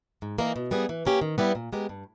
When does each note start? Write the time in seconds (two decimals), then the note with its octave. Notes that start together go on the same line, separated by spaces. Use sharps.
0.22 G#2
0.38 E3 A#3 D#4 A#4
0.56 B2
0.71 G3 B3 E4 G#4
0.89 E3
1.05 A#3 C#4 G4
1.21 D#3
1.38 G3 B3 E4 G4
1.55 A#2
1.73 G#3 B3 G4 A#4
1.89 G2